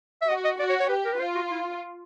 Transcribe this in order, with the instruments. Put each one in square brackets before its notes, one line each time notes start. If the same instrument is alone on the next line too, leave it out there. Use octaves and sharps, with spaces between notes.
[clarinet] E5
[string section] F#4 [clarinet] D#5
[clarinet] D#5
[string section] F#4 [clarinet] D5
[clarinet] C#5
C#5
[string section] G4 [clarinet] B4
[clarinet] A#4
B4
[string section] F4 [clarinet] C5
[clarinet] F#4
E4